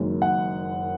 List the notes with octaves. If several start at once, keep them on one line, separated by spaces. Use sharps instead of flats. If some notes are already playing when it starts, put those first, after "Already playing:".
Already playing: F#1 F#2 D#3 G#3
F#5